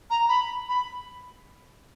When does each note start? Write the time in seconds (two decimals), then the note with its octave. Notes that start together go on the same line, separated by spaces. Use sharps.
0.10 A#5
0.29 B5
0.69 B5